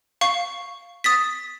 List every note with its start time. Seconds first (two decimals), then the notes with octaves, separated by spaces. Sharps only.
0.21 F5 C#6 C7
1.04 D#6 A6 B6